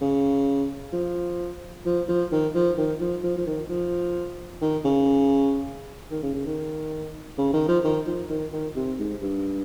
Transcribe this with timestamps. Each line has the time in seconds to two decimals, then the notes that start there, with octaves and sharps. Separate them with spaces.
0.01 C#3
0.93 F3
1.86 F3
2.08 F3
2.32 D#3
2.55 F3
2.78 D#3
3.00 F3
3.24 F3
3.38 F3
3.46 D#3
3.69 F3
4.61 D#3
4.85 C#3
6.11 D#3
6.23 C#3
6.34 C#3
6.46 D#3
7.38 C#3
7.53 D#3
7.68 F3
7.84 D#3
8.07 F3
8.29 D#3
8.53 D#3
8.76 C3
8.99 G#2
9.22 G2